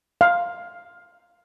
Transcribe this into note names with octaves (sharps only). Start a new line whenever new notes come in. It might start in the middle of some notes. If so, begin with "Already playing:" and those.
F5